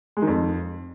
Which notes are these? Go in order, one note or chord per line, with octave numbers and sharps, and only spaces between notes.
G#3
D#3
F2